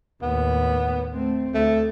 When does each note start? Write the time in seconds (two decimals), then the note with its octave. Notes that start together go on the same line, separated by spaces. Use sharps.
0.22 D#2 A2 B3
1.13 A3 C4
1.54 D2 A3